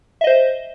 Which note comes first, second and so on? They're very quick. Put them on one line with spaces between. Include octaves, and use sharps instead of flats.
E5 D#5 C5